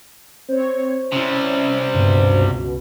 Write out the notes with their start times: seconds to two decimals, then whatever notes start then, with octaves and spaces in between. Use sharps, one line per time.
0.48 C4 C5 C#5
1.12 C3 G3 C#4 E4
1.94 C#2 G2 B2